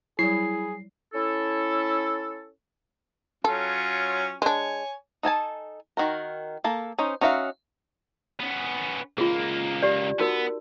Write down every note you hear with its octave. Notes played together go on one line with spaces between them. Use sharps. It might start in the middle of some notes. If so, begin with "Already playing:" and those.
F#3 G3 E4 G#4 C7
C#4 E4 A4
F#3 C#4 F4 A4
G#3 D4 C#5 G#5
D#4 A4 G#5 A5
D#3 F#4 A#4
A#3 A4
C#4 D#4 C5
C#4 D#4 F#4 E5 F5
B3 C#4
C#2 A#3 F4 G#4
G4 D5
B3 D#4 F#4 A#4